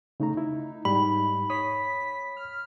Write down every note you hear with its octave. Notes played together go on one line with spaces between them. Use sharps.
C#3 A3 D#4 A#5
E4
G#2 G3 B5
C#5 D#6 B6
F6